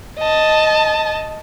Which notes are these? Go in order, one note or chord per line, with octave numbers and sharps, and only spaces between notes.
D#5 A5